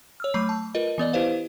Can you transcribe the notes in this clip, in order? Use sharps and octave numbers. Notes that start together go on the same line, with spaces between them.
C#5 E6 F6
F#3 A3 B5 D6 C7
A5
F4 A#4 B4 D#5
E3 B3 D5 D#5
E4 G4 B4 C5 F5